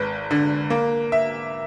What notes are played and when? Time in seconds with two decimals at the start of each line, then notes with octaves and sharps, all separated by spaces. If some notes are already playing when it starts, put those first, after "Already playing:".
Already playing: G#1 B4
0.31 D3
0.70 A#3
1.12 E5